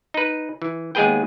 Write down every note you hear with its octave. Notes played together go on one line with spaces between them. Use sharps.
D#4 B4
E3
D#2 G#3 B3 G#4 B4 G5